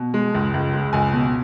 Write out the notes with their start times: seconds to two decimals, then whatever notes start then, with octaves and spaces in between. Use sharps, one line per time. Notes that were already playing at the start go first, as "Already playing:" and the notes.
Already playing: B2
0.14 G#3
0.35 C#2
0.54 C#2
0.74 G#3
0.93 C#2 G#5
1.13 B2